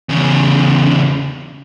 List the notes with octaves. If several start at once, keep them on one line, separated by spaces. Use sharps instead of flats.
E2 C#3